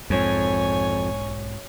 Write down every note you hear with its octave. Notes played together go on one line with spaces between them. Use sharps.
B1 F2 G#2 G#3 C#5 G#5